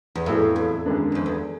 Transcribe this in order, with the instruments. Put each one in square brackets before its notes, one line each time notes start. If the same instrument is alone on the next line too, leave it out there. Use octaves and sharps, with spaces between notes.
[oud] E2
[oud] F2 [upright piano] A2 F#3 B3 E4 G#4
[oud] E2
[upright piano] F#2 D#3 G#3 B3 D4
[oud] E2
F2
E2